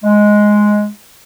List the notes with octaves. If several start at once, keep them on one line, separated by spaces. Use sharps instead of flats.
G#3